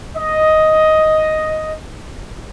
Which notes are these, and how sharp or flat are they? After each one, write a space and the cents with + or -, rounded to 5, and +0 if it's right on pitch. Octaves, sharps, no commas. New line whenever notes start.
D#5 +5